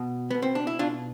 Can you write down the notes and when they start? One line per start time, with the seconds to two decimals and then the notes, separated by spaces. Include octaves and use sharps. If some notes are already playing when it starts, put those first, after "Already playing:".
Already playing: B2
0.31 B2 B3
0.42 C4
0.55 D4
0.67 E4
0.79 B2 D4 F4